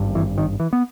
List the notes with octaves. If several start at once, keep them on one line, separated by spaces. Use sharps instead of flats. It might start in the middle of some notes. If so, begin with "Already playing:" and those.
Already playing: G#1 G2
E3
D#3
E3
B3